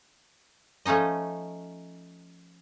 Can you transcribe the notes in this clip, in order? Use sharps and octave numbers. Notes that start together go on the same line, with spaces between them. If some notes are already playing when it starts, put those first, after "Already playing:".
F3 A3 C#4 D#4 D#5